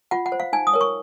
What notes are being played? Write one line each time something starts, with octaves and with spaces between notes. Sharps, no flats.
F4 F#5
F#5
C5
F5
D#4 G#5
D#6
A#4 C#5
C#6